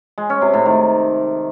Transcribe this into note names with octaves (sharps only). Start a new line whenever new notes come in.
G#3
C#4
C3
A2
D#3